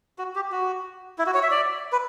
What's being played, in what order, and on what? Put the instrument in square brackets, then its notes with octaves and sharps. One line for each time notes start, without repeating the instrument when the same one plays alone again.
[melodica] F#4
G4
F#4
E4
F#4
C#5
E5
D5
B4